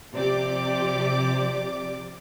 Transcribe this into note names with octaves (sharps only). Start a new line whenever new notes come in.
C3 F3 G4 D5 D6